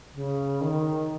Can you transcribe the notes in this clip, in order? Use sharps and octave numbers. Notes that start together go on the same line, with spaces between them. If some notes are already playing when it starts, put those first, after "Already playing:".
C#3
D#3